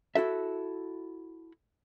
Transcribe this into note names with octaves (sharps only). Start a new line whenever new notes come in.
E4 F#4 A4 E5